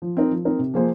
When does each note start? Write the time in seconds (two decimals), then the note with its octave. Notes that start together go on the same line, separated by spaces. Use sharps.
0.02 F3
0.17 C4 D#4 A#4
0.31 F3
0.45 C4 D#4 A#4
0.59 C3
0.74 F3 A#3 G#4 C5